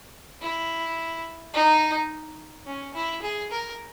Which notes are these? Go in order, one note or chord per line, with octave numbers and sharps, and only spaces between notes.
E4
D#4
C#4
E4
G#4
A#4